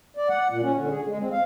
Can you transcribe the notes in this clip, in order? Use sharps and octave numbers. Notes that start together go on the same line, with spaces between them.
D5
F#5
A#2
C#4
D3
G#4
G#3
C4
F5